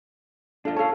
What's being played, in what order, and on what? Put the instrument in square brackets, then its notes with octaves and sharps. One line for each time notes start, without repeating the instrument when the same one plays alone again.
[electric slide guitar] D4 F4 [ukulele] A4 D#5
[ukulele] A4 A5 [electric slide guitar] C#5 F5